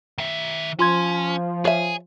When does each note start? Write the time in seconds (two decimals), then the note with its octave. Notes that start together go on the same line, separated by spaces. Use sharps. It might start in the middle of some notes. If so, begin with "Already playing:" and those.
0.18 D#3 E5
0.79 F3 C#4 F4 C6 G#6
1.65 G#4 C#5 E5 G#5